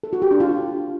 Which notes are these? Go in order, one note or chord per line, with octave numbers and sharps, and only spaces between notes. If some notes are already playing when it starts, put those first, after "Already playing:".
A4
F#4
G4
D4
F4